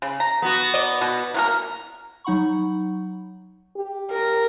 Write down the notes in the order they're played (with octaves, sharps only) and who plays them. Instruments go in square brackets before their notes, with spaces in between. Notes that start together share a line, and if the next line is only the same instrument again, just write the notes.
[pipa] C#3
A#5
[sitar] B3 F#4
[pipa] D5 D#5
B2
A#3 F#4 A#4
[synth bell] F#3 D#4 F#5 B5 C#6
[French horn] G4
[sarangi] A#4